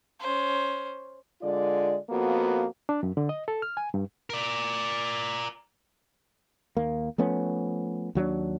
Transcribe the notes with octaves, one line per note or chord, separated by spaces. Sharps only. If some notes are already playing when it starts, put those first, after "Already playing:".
C#4 C5
D3 G#3 F4 D5
F2 A#3 B3 F#4
D4
F#2
D3
D#5
A4
F6
G#5
G2
A#4 D5
D#2 A#3
F3 A3 B3 C#4
D#2 F#3 G#3 D4